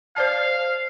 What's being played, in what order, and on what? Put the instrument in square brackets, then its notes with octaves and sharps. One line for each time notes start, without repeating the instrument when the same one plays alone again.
[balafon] C5 D5 A5 [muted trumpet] F5